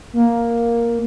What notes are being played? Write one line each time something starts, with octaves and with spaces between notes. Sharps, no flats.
A#3